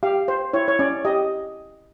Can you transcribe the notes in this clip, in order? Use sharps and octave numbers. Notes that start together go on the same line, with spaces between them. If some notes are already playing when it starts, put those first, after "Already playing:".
G4 F5
C5
E4 C#5
C#5
C#4 D5
G4 D#5